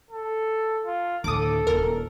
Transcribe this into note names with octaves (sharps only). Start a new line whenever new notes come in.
A4
F4
D2 A2 A4 D6 D#6
D#1 E4 A#4